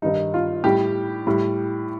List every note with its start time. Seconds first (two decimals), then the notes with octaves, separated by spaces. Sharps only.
0.02 G2 D#3 G3 D#4
0.34 F4
0.64 A2 G3 G4
1.27 A2 G3